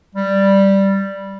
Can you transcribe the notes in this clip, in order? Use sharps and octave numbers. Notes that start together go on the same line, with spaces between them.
G3